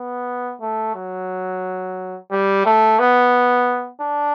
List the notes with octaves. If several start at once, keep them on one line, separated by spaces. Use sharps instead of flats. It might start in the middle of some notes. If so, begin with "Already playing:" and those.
Already playing: B3
A3
F#3
G3
A3
B3
D4